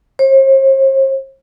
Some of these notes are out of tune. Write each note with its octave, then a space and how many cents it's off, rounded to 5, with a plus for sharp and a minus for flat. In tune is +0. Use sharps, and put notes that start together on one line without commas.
C5 +45